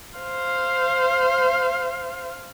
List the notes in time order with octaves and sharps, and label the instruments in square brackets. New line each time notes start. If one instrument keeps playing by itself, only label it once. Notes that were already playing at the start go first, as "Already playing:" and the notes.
[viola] C5 F5